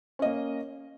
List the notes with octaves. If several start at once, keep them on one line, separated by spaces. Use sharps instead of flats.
A#3 C#4 D#5